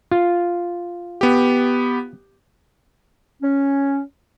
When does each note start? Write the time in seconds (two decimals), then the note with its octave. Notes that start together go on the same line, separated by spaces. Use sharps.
0.11 F4
1.21 B3 G4
3.42 C#4